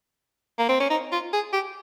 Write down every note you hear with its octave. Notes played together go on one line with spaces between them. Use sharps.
A#3
C4
C#4
D#4
F4
G#4
G4